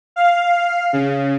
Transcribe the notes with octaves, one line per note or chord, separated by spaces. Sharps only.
F5
C#3